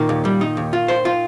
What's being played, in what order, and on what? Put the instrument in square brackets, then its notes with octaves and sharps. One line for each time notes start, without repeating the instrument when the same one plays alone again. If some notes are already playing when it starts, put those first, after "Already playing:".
Already playing: [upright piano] A#2 D#3 [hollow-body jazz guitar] A#3
[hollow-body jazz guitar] D#2
G3
D#4
D#2
F4
C5
F4